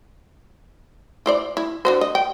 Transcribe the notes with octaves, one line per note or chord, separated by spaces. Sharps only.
E4 C5 D5
E4
D3 F#4 C5
D#5
G5